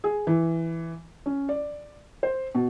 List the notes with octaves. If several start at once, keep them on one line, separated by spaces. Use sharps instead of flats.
G#4
E3
C#4
D5
C5
B2